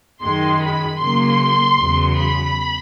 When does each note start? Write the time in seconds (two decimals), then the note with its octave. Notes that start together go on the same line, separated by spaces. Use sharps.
0.21 F#2 D#3 G#3 C6
0.61 B5
0.99 C#3 F#3 A#3 C6
1.78 E2 C#3 F#3
2.17 B5